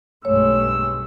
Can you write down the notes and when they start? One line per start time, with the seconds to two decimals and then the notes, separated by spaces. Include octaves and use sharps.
0.25 B1 G2 G#3 A3 C#5 E6